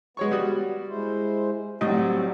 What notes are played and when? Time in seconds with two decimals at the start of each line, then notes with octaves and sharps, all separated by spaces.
0.17 G#3 B3 C#5 C#6
0.31 G3 F#4 D#6
0.88 G#3 E4 C5
1.81 C2 A2 F#3 G3 C4 D#5